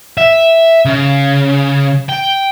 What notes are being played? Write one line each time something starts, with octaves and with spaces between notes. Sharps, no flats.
E5
C#3
G5